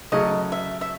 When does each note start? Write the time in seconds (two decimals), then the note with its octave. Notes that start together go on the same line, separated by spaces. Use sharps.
0.12 C#3 F#3 A3 C#4 D#5
0.52 E5
0.81 E5